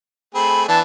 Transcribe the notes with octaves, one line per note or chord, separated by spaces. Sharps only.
A3 C4 G#4 B5
E3 B3 D4 A5